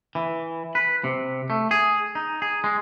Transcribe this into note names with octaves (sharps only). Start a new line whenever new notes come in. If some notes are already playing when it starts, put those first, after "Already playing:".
E3
B4
C3
A3
G#4
D#4
G#4
G#3